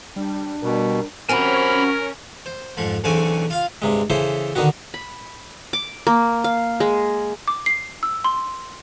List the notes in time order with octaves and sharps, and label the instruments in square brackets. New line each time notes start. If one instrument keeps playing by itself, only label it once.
[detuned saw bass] G3 [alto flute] D4
[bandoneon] B2 [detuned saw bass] G3 [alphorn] A#4
[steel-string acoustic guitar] C3 F#3 C4 [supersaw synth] C#4 [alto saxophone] A#4 [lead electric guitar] G#5 B5
[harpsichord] C5
F2 G#2 F3
B1 E2 D3 C4 C#4 G#5
F4 F5
G2 C3 G#3
C#3 E3 E4 A4 C5
D3 D#3 B3 F#4
[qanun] B5
D6
A#3
F5
G#3
[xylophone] D6
C7
E6
C6